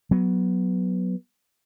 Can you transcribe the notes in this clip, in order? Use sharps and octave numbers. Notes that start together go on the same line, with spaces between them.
F#3 B3